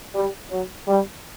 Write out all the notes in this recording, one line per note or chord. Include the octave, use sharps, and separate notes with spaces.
G3
F#3
G3